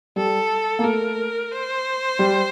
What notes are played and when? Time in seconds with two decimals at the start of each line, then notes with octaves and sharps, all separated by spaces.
0.16 G3 A4
0.79 A#3
0.83 A3 A#4
1.51 C5
2.19 G3